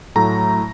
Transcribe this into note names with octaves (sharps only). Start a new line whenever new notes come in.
A2 F#3 A3 A#5